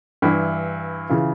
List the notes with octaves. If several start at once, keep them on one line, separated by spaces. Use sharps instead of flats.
G2 E3 E4
C#3 E3 F4